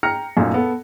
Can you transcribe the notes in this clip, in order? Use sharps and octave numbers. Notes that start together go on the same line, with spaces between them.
G5 A#5 F6 A#6 C#7
F#2 A#2 A3 A#3 D#4
B3 A4